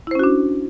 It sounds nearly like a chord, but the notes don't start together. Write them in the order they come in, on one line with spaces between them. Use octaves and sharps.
E4 C5 C#4 F#4 D4